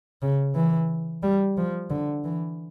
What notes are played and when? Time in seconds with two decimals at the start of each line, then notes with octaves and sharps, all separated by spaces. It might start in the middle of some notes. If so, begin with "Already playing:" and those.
0.22 C#3
0.55 E3
1.23 G3
1.57 F3
1.90 D3
2.24 E3